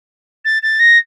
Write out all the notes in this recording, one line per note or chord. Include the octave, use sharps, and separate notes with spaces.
A6
A6
A#6